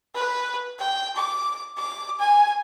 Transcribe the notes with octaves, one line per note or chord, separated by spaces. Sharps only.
B4
G5
D6
D6
G#5